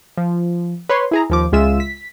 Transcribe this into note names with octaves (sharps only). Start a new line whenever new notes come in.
F3
B4 C#5 C6
E4 G#4 A#5
D#2 F3 D6
C#2 G#3 F4 E5 E6 E7
B6